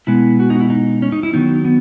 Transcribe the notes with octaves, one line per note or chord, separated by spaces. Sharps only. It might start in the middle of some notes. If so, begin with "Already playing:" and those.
B2 G#3 B3 E4
F#4
D#4
F#4
E4
D#4
C#4
D#4
E4
D#3 F#3 B3 D#4
B3